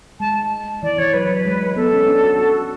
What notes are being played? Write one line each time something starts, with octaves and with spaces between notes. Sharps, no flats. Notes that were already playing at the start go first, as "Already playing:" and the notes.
G#3 A5
E3 D5
E3 C#5
F#3 B4
F#3
G#3
B3 A4
C#4
D4
F#4
F#4